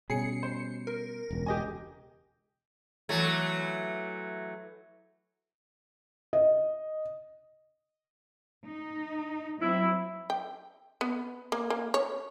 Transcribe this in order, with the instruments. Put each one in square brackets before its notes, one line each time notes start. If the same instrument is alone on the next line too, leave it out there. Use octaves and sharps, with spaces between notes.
[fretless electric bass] B2 G3 C#4 [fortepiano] G#4 [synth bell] C7 C#7
[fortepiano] C5
[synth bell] A#4
[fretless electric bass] E1 C#2
[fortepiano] G4 D#5 G#5
[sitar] E3 F#3 A3
[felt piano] D#5
[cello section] D#4
[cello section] F#3 C4 [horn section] E4
[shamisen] G5
B3
A#3
A#3
C#5